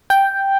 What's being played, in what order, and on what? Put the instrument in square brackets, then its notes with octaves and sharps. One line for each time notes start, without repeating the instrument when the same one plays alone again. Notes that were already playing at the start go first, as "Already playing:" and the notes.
[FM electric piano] G5